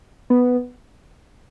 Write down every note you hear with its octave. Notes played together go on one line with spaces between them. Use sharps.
B3